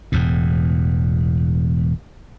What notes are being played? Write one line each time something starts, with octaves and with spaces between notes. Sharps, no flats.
E1 E2 A2